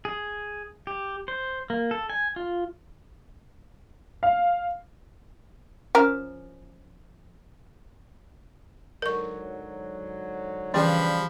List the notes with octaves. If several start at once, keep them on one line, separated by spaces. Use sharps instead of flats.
G#4
G4
C5
A#3
A4
G#5
F4
F5
F3 C#4 A#4
G#2 D3 F#3 A#4 C#6
C#3 E3 F3 G3 D4 B4 B5